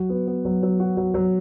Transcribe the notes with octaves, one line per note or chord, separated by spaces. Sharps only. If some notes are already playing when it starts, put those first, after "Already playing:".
Already playing: F#3 F#4
B3
B3
F#3
F#3
F#4
F#3
F#3